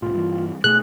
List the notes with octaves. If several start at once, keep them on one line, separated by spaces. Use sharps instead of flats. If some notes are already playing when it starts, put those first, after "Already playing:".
C2 A2 F4
G2 E3
B2 A3 G#4 F#6